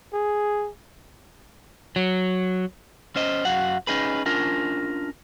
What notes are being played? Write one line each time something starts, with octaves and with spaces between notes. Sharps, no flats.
G#4
F#3
C#4 C5 D#5
F#2 F#4 F5 F#5
C#4 D#4 G#4 B4
C#4 D4 F4 A#4